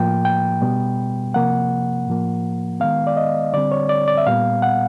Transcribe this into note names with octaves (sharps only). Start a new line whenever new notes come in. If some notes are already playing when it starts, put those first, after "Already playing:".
Already playing: A2 F3 A#3 G5
G5
B2 G3 B3
C3 F3 A#3 F#5
A2 F3 A#3
D#3 G#3 B3 F5
D5
D#5
D3 G3 C4 D5
C#5
D5
D5
E5
A#2 G3 B3 F5
F#5